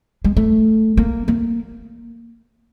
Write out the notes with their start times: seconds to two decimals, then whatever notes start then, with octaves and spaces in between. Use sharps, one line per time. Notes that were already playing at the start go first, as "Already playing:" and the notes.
0.24 G#3
0.37 A3
0.97 A#3
1.28 A#3